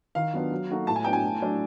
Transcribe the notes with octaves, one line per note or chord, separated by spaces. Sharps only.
D#3 F5
F#3 B3 D4 F4
F#3
A#3 D#4 F#4 A4
A2 A5
G#5
F#3 B3 D4 G5
G#5
A2
F#3 A3 D4